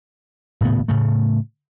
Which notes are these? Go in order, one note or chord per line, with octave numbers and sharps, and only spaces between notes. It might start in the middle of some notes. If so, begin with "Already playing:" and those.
D#1 A2 C#3 B3
A2 C#3 A3